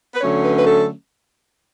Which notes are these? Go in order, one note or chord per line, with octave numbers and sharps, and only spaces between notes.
B4
D3 F#3 A3 C#4 C#5
B4
B4
A4